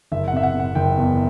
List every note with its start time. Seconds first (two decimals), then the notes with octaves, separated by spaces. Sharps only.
0.12 F#1 E5
0.28 F#5
0.33 C3 E5
0.43 F#5
0.54 C3
0.60 F#5
0.75 F#1 G5
0.97 E2